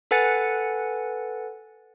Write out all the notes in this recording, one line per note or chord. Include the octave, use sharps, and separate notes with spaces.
A4 B4 F#5 G#5 A6 C#7